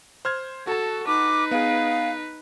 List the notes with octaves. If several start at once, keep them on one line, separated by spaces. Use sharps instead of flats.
C5 F6 G#6
F#4 A4 A5
D#4 B4 D6
B3 G#4 F5